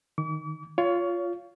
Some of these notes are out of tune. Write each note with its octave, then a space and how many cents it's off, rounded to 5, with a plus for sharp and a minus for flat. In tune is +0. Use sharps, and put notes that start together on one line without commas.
D#3 +0 D6 -45
F4 +0 C#5 +25 F5 +0